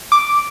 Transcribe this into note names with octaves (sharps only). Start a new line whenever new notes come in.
D6